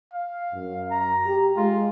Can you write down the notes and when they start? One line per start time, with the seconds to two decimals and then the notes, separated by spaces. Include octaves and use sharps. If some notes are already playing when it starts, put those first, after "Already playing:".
0.14 F5
0.53 F#2
0.91 A#5
1.26 G4
1.56 G#3 F4